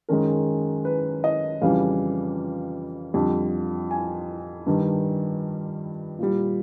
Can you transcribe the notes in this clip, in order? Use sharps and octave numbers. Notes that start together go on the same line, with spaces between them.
F#2 D#3 G#3 A#4
B4
D#5
F2 C#3 E3 G3 F5
F2 D3 G3
G#5
G2 D#3 G3
A#2 G3